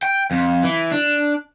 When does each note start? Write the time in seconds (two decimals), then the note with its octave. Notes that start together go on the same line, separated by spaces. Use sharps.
0.03 G5
0.31 F2
0.64 E3
0.92 D4